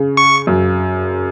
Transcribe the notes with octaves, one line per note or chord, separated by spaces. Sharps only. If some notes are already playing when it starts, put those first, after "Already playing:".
Already playing: C#3
C#6
F#2